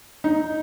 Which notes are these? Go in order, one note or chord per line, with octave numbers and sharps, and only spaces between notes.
D#4